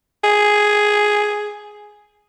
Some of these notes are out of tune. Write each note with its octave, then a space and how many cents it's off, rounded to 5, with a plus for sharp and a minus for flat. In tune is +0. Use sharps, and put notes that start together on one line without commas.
G#4 +5